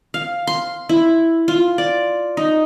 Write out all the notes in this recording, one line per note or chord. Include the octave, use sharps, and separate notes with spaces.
F5
C6
E4
F4
D5
D#4